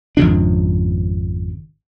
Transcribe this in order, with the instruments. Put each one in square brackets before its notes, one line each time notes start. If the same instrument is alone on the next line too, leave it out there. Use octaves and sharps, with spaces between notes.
[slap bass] G#1 F2 C#3 D4